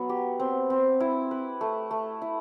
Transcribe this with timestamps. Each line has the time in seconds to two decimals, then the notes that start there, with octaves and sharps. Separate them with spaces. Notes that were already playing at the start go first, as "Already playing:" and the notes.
Already playing: F#3 B3
0.09 G4
0.40 C4
0.70 C4
1.00 E4
1.31 B4
1.61 A3
1.91 A3
2.22 E4